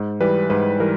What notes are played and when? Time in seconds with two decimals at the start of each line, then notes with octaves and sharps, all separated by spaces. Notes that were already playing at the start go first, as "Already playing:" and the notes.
Already playing: G#2
0.21 E3 G3 B4
0.50 G#2 B4
0.80 E3 G3 A#4